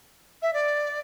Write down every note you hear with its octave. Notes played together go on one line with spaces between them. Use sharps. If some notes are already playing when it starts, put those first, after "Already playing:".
E5
D5